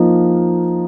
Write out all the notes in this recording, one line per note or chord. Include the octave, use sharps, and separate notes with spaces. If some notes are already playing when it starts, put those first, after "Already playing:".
Already playing: F3 A#3 D#4